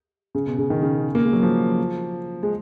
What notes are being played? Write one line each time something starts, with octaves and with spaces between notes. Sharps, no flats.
C#3
B2
C#3
D#3
C#3
A#3
G#3
F#3
F3
G#3